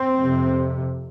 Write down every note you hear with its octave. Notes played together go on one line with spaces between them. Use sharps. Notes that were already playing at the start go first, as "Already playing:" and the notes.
Already playing: C4
F2 C3